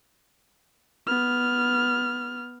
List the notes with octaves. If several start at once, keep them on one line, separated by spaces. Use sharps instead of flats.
B3 F6